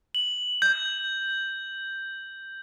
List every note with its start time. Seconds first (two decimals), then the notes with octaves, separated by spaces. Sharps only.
0.15 F#7
0.62 G6